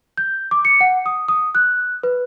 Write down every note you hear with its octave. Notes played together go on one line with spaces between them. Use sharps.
G6
D6
C#7
F#5
D#6
D#6
F#6
B4